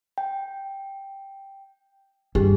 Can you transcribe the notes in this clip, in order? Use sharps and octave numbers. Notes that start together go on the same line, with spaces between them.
G5
G2 G4 G#4